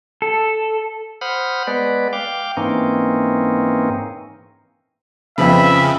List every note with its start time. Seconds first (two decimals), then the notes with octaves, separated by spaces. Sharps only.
0.22 A4
1.21 C5 F#5 B5 D#6 F6
1.67 G#3 B3 B4 D5
2.13 F5 G5 D6
2.57 G#2 E3 A#3 C4 C#4 D#4
5.38 F2 C#3 F3 B3 E5 B5